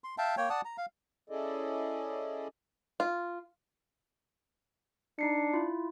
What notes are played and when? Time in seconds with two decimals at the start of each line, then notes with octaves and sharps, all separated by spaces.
0.04 C6
0.18 E5 F5 G5 A5
0.37 A#3 C#5 G5
0.50 D5 F#5 A5 D#6
0.65 A#5
0.78 F5
1.30 C#4 E4 G#4 A4 D5 D#5
3.00 F4
5.19 D4 D#4 C7 C#7
5.54 E4 F4